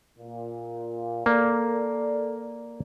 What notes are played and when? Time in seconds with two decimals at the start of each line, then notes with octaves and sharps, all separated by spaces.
0.19 A#2
1.26 A#3 A4 A#4 D5